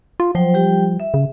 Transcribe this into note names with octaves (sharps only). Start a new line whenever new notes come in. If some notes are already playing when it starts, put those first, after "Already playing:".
F4
F3 F#3 C5 G5
G3 G4 G5
E5
C#3